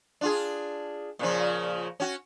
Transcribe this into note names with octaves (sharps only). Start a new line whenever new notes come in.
D4 F4 G#4
A#2 C#3 F3
C#4 F#4